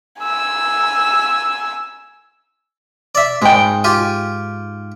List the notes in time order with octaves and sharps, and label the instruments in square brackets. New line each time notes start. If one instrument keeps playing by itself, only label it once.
[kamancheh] G#5 E6
[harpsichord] D5 E5
[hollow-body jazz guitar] G#2 G5 [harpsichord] G#3
[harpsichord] F4 G4 G#5